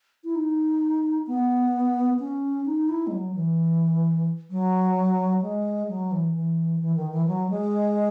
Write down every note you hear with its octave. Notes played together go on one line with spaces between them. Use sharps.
E4
D#4
B3
C#4
D#4
E4
G#3
F#3
E3
F#3
G#3
F#3
E3
E3
E3
D#3
E3
F#3
G#3